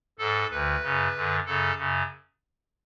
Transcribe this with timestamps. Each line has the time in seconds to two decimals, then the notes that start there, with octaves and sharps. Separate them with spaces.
0.19 G#2 A4
0.51 D2 D3 B4
0.83 F#2 C#3
1.14 F#2 D3
1.46 F#2 C#3 A4
1.77 F#2 C#3